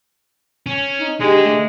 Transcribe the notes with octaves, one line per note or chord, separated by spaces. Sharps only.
C#4
D#4
D3 G#3 D4 G4
A3